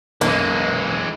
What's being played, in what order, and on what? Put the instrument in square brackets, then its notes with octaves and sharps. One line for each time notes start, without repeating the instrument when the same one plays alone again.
[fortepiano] B1 F#2 [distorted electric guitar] E3 G#3 [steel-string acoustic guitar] A#3